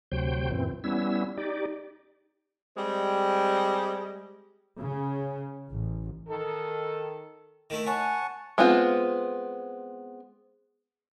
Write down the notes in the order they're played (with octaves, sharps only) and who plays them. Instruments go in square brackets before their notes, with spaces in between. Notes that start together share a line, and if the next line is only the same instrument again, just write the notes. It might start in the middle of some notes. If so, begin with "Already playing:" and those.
[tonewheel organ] D2 C3 F#3 C5 G5
F#2 A#2 E3 C4
G3 B3 C#4 E4 E6
D#4 G4 D5
[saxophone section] G3 G#3 C4 G4
[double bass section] C#3
A1
[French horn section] D#3 A4
[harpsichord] D#3 A3 E4
[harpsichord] C#5 [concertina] F#5 A5 C#6 [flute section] G#5
[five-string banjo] G#3 B3 C4 F4